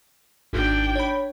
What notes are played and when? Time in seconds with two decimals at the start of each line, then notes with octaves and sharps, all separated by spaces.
0.53 G#1 D4 G5
0.95 C#5 B5